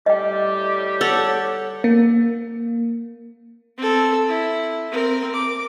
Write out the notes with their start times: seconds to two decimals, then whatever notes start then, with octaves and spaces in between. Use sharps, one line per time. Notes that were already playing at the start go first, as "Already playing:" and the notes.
0.06 A2 G3 G4 D#5 G5
1.01 A4 C#5 F#5
1.84 A#3
3.78 C4 A4
4.29 E4
4.92 C4 A#4
5.35 D6